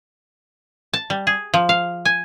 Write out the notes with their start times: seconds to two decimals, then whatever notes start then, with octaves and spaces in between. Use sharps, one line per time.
0.93 A5
1.10 G3
1.27 G#4
1.54 F3
1.69 F5
2.05 G#5